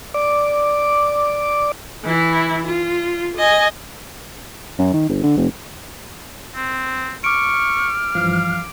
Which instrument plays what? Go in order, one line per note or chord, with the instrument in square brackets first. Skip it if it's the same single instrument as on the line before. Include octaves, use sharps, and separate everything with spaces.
[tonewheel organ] D5 D6
[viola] E3 E4
F4
D#5 G#5
[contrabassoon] F#2
D#3
G1
D3
F1
[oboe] C4
[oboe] C#6 [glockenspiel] D6 D7 [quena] F6
[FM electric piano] G2 E3 F3 [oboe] F5